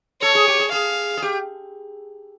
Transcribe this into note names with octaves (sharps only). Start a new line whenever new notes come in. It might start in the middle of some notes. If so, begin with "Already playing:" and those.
A4 C#5
G#4
G4
G#4
G#4 F5
G#4
G4